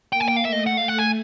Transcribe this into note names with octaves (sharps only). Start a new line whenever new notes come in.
A#3 G5
G#5
G5
F5
A3 E5
D#5
F#5
F5
F#5
G#5